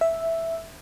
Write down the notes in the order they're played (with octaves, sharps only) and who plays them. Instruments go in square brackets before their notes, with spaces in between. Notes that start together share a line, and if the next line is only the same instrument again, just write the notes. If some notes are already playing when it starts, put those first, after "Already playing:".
[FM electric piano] E5